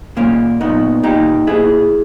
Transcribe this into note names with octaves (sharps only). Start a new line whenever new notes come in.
A#2 A#3 C#4
A#2 B3 D#4
A#2 D#4 G4
A#2 E4 G#4